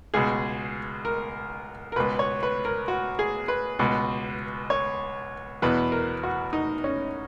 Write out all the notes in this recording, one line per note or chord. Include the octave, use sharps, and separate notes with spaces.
C#2 B2 G#4
A#4
A#4
C#2 B2 B4
C#5
B4
A#4
F#4
G#4
B4
C#2 B2
C#5
E2 B2 B4
A#4
F#4
D#4
C#4